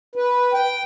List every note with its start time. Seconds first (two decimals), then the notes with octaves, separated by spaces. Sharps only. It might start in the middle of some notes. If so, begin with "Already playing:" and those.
0.16 B4
0.54 G5